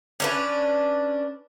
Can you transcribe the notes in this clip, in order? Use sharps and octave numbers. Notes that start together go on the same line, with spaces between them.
C#4 D4 B4